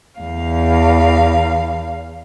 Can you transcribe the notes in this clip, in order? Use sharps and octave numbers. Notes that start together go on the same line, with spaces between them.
E2 F5